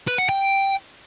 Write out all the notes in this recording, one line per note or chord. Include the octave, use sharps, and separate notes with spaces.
B4
F#5
G5